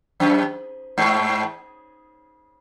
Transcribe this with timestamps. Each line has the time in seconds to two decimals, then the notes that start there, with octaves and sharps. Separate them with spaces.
0.20 F#2
0.98 G#2